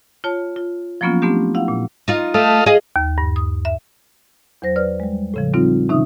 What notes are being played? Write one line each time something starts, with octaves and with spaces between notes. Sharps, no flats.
F4 C#5 A5
F4
F3 F#3 A#3 B3 C#4 F4
A3 B3 C4 D4 G4
E4 F5 F#5
A#2
D#4 F4
A3 A4 D#5 F5
G#4 D#5 F5
D#2
G2
D#6
E5
E2 F#3 C5 A#6
B4 D5 F6
G3 G#3
A2 C#3 F3
G3 C4 D#4 F4
C3 D#3 C#4 D#4 E5 D#6